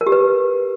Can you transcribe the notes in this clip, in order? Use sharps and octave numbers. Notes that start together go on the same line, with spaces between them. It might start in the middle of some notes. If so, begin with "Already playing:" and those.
A#4
G4
B4